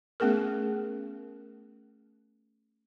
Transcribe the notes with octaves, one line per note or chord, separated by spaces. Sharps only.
A3 B3 C#4 G#4 A#4